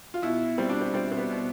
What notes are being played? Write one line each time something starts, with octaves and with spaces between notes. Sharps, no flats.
F4
B2 E4
G3 C4
D4
C4
G3 C4
C4
B3
B2